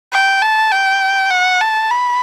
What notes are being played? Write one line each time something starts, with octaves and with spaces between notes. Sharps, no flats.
G5
A5
G5
F#5
A5
B5